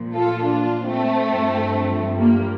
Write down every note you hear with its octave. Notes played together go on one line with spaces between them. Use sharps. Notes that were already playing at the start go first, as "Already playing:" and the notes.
Already playing: A#2 F3
F4 A4
D4 F4
A3 C4
G2 F3
G3 A#3